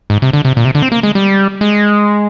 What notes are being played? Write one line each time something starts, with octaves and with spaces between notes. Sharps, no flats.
G#2
C3
D3
C3
A#2
C3
D3
C4
A#3
G#3
G3
G#3